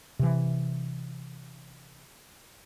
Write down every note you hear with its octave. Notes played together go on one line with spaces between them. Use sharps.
C3 E3